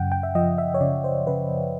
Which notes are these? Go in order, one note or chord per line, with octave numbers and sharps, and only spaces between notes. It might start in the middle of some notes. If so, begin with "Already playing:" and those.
Already playing: F#2 C#3 F#5 G5
G5
E5
F3 D#5
E5
C#5
C#3 D5
C5
C#3 B4